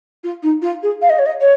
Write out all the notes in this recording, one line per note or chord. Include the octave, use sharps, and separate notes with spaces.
F4
D#4
F4
G#4
F5
D#5
C#5
D#5
C#5